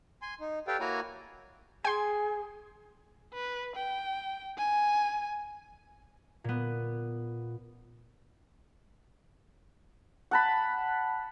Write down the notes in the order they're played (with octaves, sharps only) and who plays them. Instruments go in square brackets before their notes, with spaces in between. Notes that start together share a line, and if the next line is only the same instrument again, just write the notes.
[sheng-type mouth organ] G#5 C6
D#4
G4 A4 B4 D5 F5 G5
A#3 E4 F#4 C#5 G#5 A#5
[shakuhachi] G#4 [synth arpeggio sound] G5 C6 [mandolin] G#5
[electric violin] B4
G5
G#5
[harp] A#2 B3
[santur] F#5 A5 B5